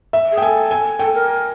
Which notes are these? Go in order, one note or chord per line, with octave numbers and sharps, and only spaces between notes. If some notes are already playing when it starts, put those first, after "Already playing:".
E5
G#4
G5
A4 G#5
G#5
A4 G5
A#4